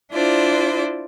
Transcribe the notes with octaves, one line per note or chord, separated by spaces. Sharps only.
D4 E4 F4 C5 D5